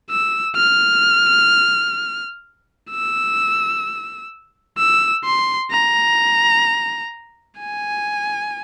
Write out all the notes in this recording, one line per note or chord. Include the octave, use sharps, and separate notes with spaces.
E6
F6
E6
E6
C6
A#5
G#5